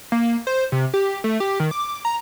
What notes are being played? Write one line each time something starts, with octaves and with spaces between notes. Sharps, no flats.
A#3
C5
C3
G4
A3
G4
D#3
D6
A#5